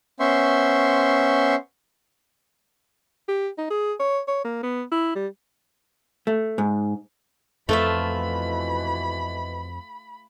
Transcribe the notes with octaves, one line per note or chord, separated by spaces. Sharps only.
B3 C#4 C5 E5 C6 C#6
G4
D#4
G#4
C#5
C#5
A#3
B3
E4
G3
A3
G#2
F2 B2 E3 A3 F4 E5 B5